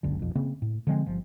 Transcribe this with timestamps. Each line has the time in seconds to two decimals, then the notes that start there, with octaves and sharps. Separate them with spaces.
0.03 F#1 C#2 D3
0.19 B1 F2
0.35 C#3 A#3 C4
0.62 A2
0.87 D3 F3 G#3 C4
1.06 G1 F3